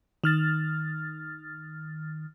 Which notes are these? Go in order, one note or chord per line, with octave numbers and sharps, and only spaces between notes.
D#3 F6 A6